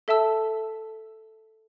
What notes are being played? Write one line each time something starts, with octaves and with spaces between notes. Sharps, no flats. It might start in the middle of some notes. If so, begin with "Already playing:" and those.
A4 E5 A5 E6